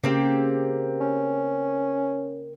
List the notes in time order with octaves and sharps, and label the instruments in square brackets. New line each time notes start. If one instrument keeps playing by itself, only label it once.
[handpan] C#3 [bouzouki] A#3 C4 G4
[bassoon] C#4